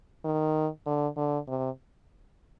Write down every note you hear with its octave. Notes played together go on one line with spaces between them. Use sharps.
D#3
D3
D3
C3